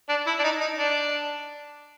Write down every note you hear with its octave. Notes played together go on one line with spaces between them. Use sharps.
D4
E4
D4
D#4
D#4
D4